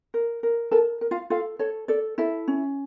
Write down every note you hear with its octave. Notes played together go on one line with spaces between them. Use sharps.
A#4
A#4
A4 A#4 A5
A#4
F4 F5
F4 A4 F5
A4 C#5
A4 D5
E4 A4 E5
C#4